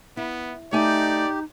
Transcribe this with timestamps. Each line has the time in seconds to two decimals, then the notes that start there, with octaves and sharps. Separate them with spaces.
0.17 B3 E4
0.73 A3 D#4 G4 D5 G#5